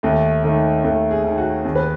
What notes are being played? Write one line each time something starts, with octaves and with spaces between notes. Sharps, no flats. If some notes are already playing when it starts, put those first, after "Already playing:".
D#2 A3
D#3 A3
D#2 A3
G#4
D#3
F#4
D#2 G#4
B4